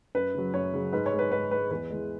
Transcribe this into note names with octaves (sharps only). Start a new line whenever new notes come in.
F#2 B4
C#3 F#3
F#2 C#5
C#3 F#3
G#2 B4
C#5
G#3
B4
G#2 B4
G#3 B4
E2 B4
E3 G#3